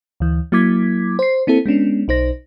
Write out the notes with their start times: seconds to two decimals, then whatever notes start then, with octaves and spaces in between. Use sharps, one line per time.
0.20 D2 E3
0.52 F#3 A#3 E4 D6 G#6 B6
1.19 C5 C7
1.47 A#3 C4 E4 A4
1.66 G#3 B3 C#4 D4
2.08 B1 D#4 C5 A#6